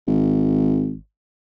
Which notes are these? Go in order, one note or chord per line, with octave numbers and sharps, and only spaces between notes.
G#1